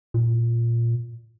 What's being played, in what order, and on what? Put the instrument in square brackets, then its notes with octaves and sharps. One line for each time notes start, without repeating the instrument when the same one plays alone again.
[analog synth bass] A#2